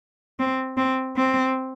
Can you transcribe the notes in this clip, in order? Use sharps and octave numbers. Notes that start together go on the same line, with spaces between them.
C4
C4
C4